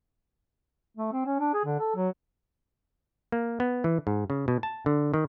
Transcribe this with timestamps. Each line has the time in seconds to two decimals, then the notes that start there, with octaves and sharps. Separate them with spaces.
0.97 A3
1.13 C4
1.26 C#4
1.40 D4
1.54 G#4
1.65 D3
1.80 A4
1.96 F#3
3.32 A#3
3.60 B3
3.84 E3
4.07 G#2
4.30 C#3
4.48 B2
4.63 A5
4.86 D3
5.14 D#3